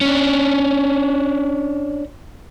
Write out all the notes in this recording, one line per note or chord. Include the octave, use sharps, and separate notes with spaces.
C#4 D4